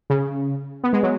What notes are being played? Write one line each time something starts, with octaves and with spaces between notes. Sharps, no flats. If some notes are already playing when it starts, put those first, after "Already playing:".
C#3
B3
G#3
F#3